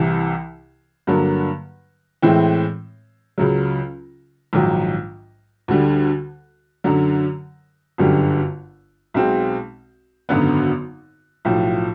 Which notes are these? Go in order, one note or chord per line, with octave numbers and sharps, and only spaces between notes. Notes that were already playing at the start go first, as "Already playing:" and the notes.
Already playing: C2 C3 E3
G2 D3 F#3 A#3
A2 E3 G#3 C4 E4
C#2 C#3 F#3
A#1 G#2 D#3 F#3
D2 D3 G3
F#2 D3 F#3
G1 F#2 D3 G3
B1 B2 G#3 C4
G#1 F#2 D3 F#3 B3
B1 A2 F3